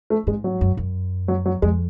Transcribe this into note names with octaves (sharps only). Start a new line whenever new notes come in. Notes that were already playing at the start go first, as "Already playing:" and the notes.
A3
G#2 G#3
F#3
F#2
F#2
F#3
F#3
F2 G#3